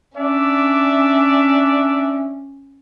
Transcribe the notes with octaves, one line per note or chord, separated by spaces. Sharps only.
C#4 D4 D5 E5